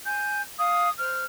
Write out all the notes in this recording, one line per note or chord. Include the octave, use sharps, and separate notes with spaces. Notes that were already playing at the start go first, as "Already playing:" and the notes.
G#5 G6
F5 D#6
C5 F6